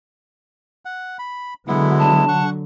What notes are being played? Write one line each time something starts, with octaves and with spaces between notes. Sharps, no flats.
F#5
B5
D3 F#3 G#3 B3 E4 F#5
A5
F#5 C#6